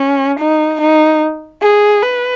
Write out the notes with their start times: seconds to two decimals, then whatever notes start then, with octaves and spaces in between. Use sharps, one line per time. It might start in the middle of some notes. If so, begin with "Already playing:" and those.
Already playing: C#4
0.39 D#4
0.81 D#4
1.63 G#4
2.03 B4